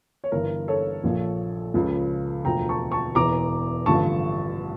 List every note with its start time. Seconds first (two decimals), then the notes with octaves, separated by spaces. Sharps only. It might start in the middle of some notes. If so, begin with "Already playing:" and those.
0.24 C#5
0.32 G1 G2 E3 A#4
0.68 A4 C#5
1.04 A#1 A#2 F3
1.74 C#2 C#3 F3
2.44 E1 D2 D3 F3 G5 A#5
2.69 A5 C#6
2.92 A5 C#6
3.15 E1 E2 E3 A#5 D6
3.86 A1 G2 D3 F3 A5 C#6